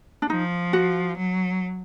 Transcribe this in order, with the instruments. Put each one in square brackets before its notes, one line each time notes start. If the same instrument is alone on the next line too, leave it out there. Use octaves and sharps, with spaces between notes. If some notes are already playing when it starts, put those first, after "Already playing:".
[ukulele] D4
[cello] F3 [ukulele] D#4
[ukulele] F#4
[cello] F#3